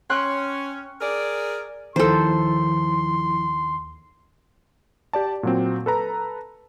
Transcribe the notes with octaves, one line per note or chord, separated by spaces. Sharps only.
C#4 G5 C6 F#6
G#4 A#4 D5
D#2 D#3 F3 E4 A4 C5 C6
G4 D5 A5
A#2 F#3 C4
A4 B4 A#5